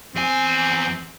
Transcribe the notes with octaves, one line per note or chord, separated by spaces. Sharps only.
E2 C4 G#5